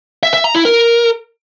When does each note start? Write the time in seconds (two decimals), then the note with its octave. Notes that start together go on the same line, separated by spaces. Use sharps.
0.23 E5
0.34 E5
0.44 A#5
0.55 E4
0.65 A#4